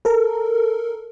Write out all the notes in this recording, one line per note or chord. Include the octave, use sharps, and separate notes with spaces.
A4 A#4